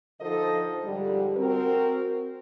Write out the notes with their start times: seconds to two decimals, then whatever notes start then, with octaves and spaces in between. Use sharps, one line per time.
0.20 D3 F3 D#4 A4 C5 D#5
0.83 G#2 D3 F3 G3
1.36 C4 F#4 A#4